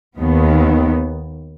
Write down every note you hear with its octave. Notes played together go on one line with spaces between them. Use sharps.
D#2 D#3 B3